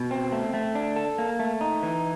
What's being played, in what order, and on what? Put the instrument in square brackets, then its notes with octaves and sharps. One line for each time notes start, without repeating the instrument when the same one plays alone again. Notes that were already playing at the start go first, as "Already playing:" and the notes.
Already playing: [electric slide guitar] B2
C4
A3
A3
D4
A4
A#3
A3
D#4
E3